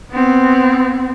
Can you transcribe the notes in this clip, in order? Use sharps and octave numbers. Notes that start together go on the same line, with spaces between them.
B3 C4